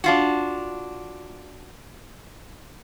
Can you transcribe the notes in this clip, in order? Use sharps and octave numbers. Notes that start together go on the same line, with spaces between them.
D4 F4 F#4